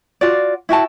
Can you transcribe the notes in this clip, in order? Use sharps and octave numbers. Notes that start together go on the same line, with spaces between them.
F4 F#4 D5
E4 F#4 G5 A5